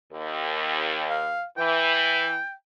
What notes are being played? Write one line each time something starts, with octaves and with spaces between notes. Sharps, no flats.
D#2
F5
E3 G5